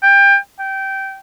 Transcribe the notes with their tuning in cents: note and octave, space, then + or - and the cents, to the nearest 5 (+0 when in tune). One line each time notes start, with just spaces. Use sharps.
G5 +25
G5 -15